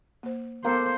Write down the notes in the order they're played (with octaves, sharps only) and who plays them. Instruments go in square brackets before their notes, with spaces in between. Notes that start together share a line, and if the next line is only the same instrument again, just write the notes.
[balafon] A#3 C5
[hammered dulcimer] A#3 A4 [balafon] B3 [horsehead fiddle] C5